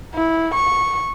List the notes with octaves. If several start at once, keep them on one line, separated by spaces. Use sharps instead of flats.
E4
C#6